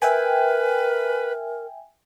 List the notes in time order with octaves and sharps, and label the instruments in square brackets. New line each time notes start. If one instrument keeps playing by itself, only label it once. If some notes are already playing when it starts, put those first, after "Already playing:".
[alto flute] A#4 [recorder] B4 [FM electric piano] E5 G5 G#5